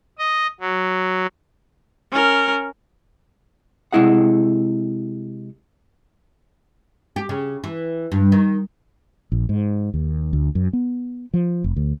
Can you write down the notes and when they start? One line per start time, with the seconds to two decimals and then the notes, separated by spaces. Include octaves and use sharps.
0.19 D#5
0.60 F#3
2.11 C#4 A#4
3.93 C3 G#3 E4 G#4 F#5
7.16 G4
7.29 C#3
7.64 E3
8.12 G2
8.32 D#3
9.32 A#1
9.49 G#2
9.94 D#2
10.33 D2
10.55 F#2
10.73 B3
11.34 F3
11.64 F1
11.76 D2